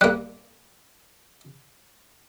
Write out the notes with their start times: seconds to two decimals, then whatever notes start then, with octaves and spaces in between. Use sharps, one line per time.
0.01 G3 A#3 F#6